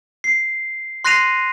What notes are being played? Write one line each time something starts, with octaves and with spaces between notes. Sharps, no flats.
C7
C6 F#6 A#6 C7 D#7 F7